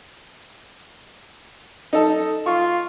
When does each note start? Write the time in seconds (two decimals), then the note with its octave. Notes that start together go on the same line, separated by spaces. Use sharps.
1.93 D#4 A4
2.46 F4 C#6